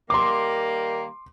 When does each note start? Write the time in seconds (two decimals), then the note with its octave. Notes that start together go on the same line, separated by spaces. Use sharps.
0.10 D#3 G3 A#3 C6 D6